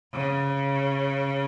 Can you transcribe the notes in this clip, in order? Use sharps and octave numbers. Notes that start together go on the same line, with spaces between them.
C#3